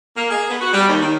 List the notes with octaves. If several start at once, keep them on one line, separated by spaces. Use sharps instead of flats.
A#3
G#4
B3
F#4
G3
D#2
D#3